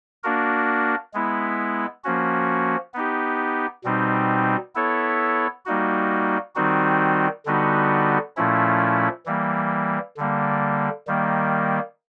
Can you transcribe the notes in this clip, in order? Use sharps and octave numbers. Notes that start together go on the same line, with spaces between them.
A#3 D4 F#4 A#4
G#3 B3 E4
F3 A#3 C#4 F#4
B3 D#4 G4
B2 G3 C4 D#4
B3 E4 A4 C#5
G3 A#3 D#4 F#4
D#3 G3 C4 D#4 F#4
D3 G3 B3 D#4 F#4
A#2 F3 A3 C#4 E4
E3 G3 A#3
D3 G3 A#3
D#3 G3 A#3